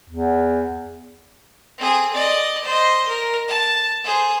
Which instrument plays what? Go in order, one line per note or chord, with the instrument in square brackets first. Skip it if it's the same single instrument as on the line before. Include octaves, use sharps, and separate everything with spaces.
[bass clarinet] E2
[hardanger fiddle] C4 G#4
D5 D#5
C5 D#5
A#4
A5
G#4 C5